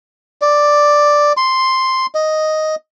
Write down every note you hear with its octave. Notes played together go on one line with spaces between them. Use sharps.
D5
C6
D#5